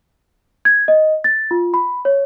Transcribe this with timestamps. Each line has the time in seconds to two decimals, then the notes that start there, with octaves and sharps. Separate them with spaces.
0.65 G#6
0.88 D#5
1.24 A6
1.51 F4
1.74 B5
2.05 C#5